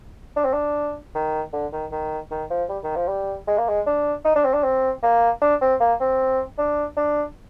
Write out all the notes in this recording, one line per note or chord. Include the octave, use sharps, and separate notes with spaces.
D4
C4
D4
D#3
D3
D#3
D#3
D#3
F3
G3
D#3
F3
G3
G#3
A#3
G#3
D4
D#4
D4
C4
D4
C4
A#3
D4
C4
A#3
C4
D4
D4